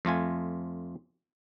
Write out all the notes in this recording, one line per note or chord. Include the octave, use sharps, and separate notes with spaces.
F2 A3 F4 G#5